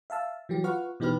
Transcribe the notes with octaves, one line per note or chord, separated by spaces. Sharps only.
E5 F5 A5 E6
E3 F#3 G4
F4 B4 F#5 C#6 F6
B2 E3 D#4 G4 B4 F6